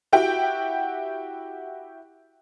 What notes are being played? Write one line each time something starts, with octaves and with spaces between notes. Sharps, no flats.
E4 F#4 G4 G5